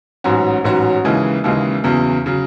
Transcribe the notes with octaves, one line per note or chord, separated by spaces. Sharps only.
A1 G#2 F#3 C#4 F#4
A1 G#2 F#3 C#4 F#4
D#2 C#3 E3 G#3
D#2 C#3 E3 G#3
E2 C#3 F#3
C#3 F#3